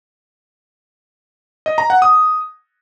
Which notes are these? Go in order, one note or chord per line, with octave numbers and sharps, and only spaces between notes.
D#5
A#5
F#5
D#6